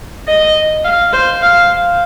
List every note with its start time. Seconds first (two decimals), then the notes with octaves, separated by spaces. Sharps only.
0.28 D#5
0.84 F5
1.13 C5
1.42 F5